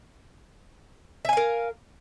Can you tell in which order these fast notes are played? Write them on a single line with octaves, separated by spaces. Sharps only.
E5 G#5 F5 A#4